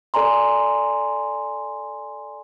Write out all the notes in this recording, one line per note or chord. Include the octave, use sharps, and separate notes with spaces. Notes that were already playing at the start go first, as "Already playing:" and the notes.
A4 D5 G#5 A#5 C6